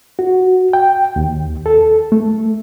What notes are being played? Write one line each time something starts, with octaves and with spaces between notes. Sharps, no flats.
F#4
G5
D#2
A4
A3